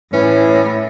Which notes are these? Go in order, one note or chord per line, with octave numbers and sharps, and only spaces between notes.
A2 E3 C#4